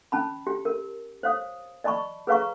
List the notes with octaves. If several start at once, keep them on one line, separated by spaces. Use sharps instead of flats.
C#4 A5 B5
G4
A#4
C5 C#5 F5 D#6
D5 D#5 A5 B5 C#6
G#4 B4 C#5 F5 A#5 C#6